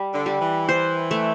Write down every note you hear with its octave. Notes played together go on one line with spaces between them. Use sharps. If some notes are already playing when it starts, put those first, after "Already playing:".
Already playing: G3
D3
G3
E3
C5
A3